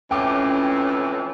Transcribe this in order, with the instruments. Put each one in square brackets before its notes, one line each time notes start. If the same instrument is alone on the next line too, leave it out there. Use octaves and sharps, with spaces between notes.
[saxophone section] F2 A2 E3 [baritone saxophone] C#4 [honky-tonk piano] G5 D6